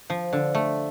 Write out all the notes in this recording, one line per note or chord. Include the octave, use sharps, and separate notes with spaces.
F3
D3
A3